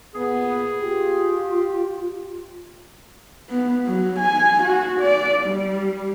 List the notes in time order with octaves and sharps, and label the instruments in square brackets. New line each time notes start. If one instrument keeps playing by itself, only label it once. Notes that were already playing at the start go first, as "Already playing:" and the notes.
[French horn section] A#2 B3 [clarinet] G#4
[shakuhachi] F4 [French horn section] G4
[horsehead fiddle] B3
F#3
G#5
F#4
D5
G3